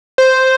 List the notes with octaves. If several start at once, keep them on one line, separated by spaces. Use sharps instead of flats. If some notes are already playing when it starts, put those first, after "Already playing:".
C5